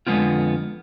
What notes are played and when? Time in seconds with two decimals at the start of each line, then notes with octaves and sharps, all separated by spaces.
0.07 F2 D3 G#3 B3 C4 F4